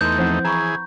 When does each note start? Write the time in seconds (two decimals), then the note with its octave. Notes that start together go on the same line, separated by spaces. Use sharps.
0.01 E2 A3 D#4 B4 C6 G6
0.18 F3 C4 E4 C5 F#5
0.45 E3 G#4 A#5 B5 C#6